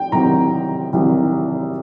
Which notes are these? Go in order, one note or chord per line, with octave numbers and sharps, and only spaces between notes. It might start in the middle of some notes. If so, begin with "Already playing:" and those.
Already playing: G5
C2 C3 D#3 F#3 A#5
C2 C3 D#3 F#3